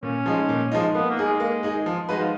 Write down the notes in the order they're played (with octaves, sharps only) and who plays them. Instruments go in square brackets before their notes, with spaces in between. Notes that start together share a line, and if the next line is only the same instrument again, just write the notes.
[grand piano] A#2 [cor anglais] C#4
[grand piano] F3 G#3 D#4
A#2
F3 G#3 D#4
[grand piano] A#3 [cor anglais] B3
[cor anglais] A#3
[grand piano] D#4 G#4
[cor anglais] G#3
[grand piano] A#3
D#4 G#4
F3
G#3 D#4 F#4 B4
[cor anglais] F3